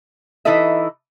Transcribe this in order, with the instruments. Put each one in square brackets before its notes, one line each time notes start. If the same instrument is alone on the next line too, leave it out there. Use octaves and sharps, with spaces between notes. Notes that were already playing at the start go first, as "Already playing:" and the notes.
[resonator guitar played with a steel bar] E3 D#4 E4 A4 D#5 E5